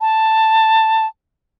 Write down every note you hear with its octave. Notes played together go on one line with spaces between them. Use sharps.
A5